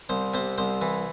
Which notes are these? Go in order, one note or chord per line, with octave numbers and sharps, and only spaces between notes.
C2 C5
C3 C5
C2 C5
E3